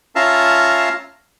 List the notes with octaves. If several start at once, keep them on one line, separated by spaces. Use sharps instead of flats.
C#4 F4 E5 F5 A5 A#5